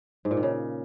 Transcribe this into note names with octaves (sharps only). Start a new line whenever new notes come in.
G#2
A#2
D#3
C#3